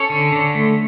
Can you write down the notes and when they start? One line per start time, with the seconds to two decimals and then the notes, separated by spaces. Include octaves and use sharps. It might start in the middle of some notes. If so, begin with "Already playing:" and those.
Already playing: C#4 A4 C#5
0.10 D3
0.32 D3
0.55 A3